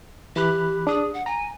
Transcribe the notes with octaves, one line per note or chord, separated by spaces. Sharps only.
E3 G4 B5 F#6
D4 G#4 D#6
F#5
G#5 A#5